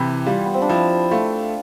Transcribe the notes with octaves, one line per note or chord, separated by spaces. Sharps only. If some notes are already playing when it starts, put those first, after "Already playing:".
Already playing: C3 E3 E4 G4 A4
G3 F4
B3
C4
D4
F3 E4
A3 F4